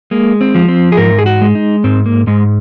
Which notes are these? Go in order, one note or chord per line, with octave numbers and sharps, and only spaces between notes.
G#3 A#3
C4
F3
C4
G#4
G#2 A#4
G#4
F#4
G#3
D#4
G#2 C4
A#3
G#2 G#3